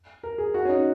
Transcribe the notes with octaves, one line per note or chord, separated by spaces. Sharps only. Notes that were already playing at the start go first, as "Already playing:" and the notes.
A#4
G#4
F#4
C#4
D#4